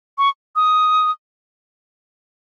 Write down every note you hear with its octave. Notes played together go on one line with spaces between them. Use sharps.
C#6
D#6